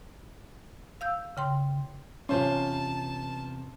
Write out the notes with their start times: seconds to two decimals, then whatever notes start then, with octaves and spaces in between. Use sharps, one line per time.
1.01 F5 E6 G6
1.37 C#3 G5 C6
2.29 E2 C3 C#4 F4 C5 A5 C6